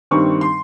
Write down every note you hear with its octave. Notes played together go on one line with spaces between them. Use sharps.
G2 D#3 G3 C4 D#4 C#6
C6